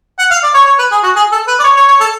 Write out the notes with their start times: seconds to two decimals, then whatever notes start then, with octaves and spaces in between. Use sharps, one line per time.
0.19 F#5
0.31 F5
0.43 D5
0.54 C#5
0.67 C#5
0.79 B4
0.92 G#4
1.03 F#4
1.16 G#4
1.32 A4
1.48 B4
1.60 D5
1.64 C#5
1.77 C#5
1.89 C#5
2.01 A4